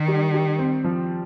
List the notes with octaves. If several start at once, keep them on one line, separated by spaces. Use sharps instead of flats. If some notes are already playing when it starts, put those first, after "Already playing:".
Already playing: D#3
G3
G3
C4
F3